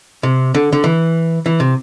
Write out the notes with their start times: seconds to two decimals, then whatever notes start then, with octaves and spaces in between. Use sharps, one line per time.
0.23 C3
0.54 D3
0.73 D3
0.84 E3
1.46 E3
1.60 C3